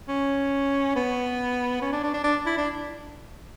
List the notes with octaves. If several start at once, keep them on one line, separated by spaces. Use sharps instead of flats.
C#4
B3
C#4
D4
D4
D4
D4
E4
D4